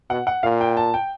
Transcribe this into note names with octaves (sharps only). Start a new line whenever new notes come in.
B2 F#5
F#5
A#2 F5
G5
A5
G5